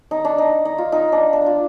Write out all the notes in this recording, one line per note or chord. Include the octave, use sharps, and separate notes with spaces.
D#4
D4
D#4
D#4
F4
D#4
D4
D4
F4